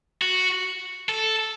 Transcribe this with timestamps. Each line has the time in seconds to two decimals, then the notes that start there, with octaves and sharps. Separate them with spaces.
0.22 F#4
1.09 A4